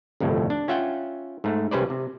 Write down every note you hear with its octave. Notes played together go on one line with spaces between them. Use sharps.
G1 C2 F2 A2
D4
C#4 F4 E5 F#5 G5
G#2 A3
C2 G3 C#4 B4 C5 D5
C3